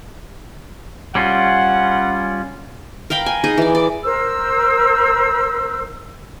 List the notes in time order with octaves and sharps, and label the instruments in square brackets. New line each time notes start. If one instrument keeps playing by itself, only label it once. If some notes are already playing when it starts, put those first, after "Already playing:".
[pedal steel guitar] G3 C#4 F4 [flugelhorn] F#5
[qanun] A#4 F5 G5 B5
G#5
D#4 G#4 D#5
E3 D5
D5
[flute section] A#4 C5 E6